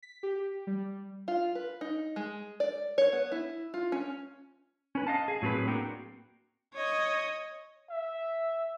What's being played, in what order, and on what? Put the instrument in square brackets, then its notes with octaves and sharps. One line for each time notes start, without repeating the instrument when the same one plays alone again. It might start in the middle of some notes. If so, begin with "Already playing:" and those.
[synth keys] B6
G4
G3
[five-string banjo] F4
B4
D#4
G#3
D5
C#5
B3
E4
F4
C#4
[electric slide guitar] C#4 B4
D#5 F5 A5
G#4
A2 F#3 C4 G#4 B4
A#3 C4 D4 F#4 A#4 G5
[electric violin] C#5 D#5
[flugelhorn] E5